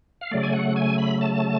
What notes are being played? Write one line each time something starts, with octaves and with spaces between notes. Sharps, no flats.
F5
C#3 F#3 A3 D5
G#5
F#5
G#5
B5
A5